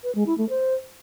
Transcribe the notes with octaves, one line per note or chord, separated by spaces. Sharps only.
B4
G#3
E4
A3
C5